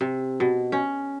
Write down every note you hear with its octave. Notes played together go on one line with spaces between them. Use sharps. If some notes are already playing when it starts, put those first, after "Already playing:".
C3
B2
C#4